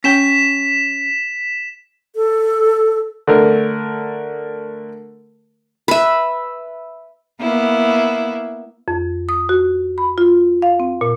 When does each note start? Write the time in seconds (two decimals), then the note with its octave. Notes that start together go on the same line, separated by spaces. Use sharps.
0.04 C#4 G5 B6 E7
2.16 A4
3.27 D3 A3 A#4
5.88 B4 E5
7.40 A#3 B3 E4
8.88 F2
9.29 D#6
9.49 F#4
9.98 B5
10.18 F4
10.62 F5
10.80 C4
11.01 A#2